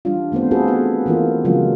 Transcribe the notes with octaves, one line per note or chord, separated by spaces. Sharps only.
E3 G3 D4 F4
D#3 A3 B3 C4 C5
C4 F4 F#4 G#4 A4 B4
B3 F#5
D#3 E3 A#3 D#4 F4
C#3 F3 F#3 G#3 A#3 F4